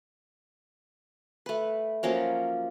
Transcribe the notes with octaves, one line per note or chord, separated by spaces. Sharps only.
A3 B4
F3 F#3 A#3 C#4